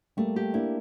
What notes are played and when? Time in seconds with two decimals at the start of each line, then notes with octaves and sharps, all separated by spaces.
0.17 G3 A3 A#3
0.36 G4
0.53 A#3 D4 E4